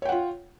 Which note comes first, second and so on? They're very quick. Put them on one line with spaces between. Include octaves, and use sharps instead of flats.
C#5 G5 F#5 F4